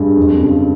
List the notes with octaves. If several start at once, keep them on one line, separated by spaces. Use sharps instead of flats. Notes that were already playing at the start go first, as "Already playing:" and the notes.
Already playing: G2 G#3
F2
C#3